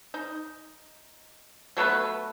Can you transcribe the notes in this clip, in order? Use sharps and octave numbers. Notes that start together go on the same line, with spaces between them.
D#4
F#3 A3 B3 B4